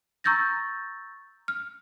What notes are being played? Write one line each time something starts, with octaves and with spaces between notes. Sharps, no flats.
A#5 C#6 E6 G6 A6 A#6
F6